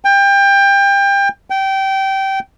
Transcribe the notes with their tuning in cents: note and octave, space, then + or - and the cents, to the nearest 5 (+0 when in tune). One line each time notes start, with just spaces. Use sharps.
G5 +25
G5 -20